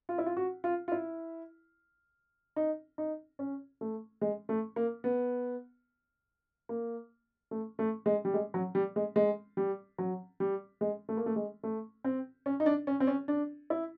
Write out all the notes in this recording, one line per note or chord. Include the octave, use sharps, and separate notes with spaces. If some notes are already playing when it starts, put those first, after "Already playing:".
F4
E4
F4
F#4
F4
F4
E4
D#4
D#4
C#4
A3
G#3
A3
A#3
B3
A#3
A3
A3
G#3
G3
G#3
F#3
G3
G#3
G#3
G3
F#3
G3
G#3
A3
A#3
A3
G#3
A3
C4
C#4
D#4
D4
C#4
C4
C#4
D4
E4